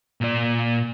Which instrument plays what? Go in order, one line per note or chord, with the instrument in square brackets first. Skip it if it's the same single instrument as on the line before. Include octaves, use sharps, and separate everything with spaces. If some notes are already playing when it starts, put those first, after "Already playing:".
[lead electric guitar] A#2 D5